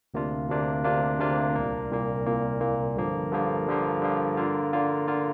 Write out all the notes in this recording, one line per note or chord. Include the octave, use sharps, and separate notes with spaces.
D2 C3 A#3 D4 F4
D2 C3 A#3 D4 F4
D2 C3 A#3 D4 F4
D2 C3 A#3 D4 F4
C2 A#2 A#3
C2 A#2 A#3
C2 A#2 A#3
C2 A#2 A#3
G2 D3 F3 A#3
G2 D3 F3 A#3
G2 D3 F3 A#3
G2 D3 F3 A#3
D3 A#3 F4
D3 A#3 F4
D3 A#3 F4